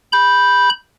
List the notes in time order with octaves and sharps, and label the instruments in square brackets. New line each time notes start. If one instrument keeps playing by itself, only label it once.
[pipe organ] B5 G6